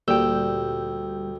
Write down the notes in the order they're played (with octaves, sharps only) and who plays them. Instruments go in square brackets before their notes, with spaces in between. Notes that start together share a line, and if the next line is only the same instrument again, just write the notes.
[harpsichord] D2 [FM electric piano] A#2 G3 G6 [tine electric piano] G5 E6